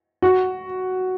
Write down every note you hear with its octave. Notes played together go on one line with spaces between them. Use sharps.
F#4